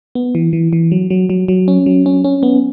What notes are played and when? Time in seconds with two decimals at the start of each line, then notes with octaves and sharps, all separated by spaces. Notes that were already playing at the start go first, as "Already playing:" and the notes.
0.15 B3
0.35 E3
0.53 E3
0.73 E3
0.92 F#3
1.10 F#3
1.30 F#3
1.48 F#3
1.68 C#4
1.86 F#3
2.06 C#4
2.24 C#4
2.43 B3